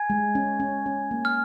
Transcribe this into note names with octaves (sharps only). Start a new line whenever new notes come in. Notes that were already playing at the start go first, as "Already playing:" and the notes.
Already playing: G#5 G#6
G#3
C#4
C#4
C#4
A#3
F6